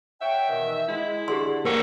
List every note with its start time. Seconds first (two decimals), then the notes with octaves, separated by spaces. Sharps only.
0.21 C#5 E5 F#5 G5
0.49 B2 D#3 E3
0.88 G#3 E4
1.28 D3 D4 G4 G#4 C6
1.65 A#3 A#4 C#5 F#5